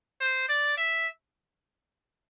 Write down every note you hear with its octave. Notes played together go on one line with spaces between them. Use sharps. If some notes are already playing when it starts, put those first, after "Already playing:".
C5
D5
E5